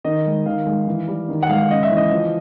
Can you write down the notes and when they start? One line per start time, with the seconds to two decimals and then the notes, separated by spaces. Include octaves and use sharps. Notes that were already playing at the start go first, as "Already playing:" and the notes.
0.04 D#3 D#5
0.26 G#3
0.46 D#3 F5
0.66 G#3
0.87 E3
1.08 G3
1.29 D#3
1.43 F#5
1.49 G#3 F5
1.70 C#3 D#5
1.83 E5
1.90 E3
1.97 D#5
2.11 F3